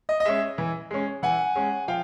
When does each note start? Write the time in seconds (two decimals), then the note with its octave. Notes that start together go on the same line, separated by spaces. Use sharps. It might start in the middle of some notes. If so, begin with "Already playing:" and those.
0.09 D#5
0.20 D#5
0.25 G#3 C#4 E5
0.58 E3
0.91 G#3 C#4
1.22 E3 F#5 G#5
1.55 G#3 C#4
1.88 F3 F5 G5